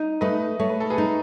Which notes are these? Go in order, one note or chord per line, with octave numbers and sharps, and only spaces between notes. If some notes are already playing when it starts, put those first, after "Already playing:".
Already playing: D#4
A3 B4 D#5
A3 C#5
B4
A4
G#4 B4
D#4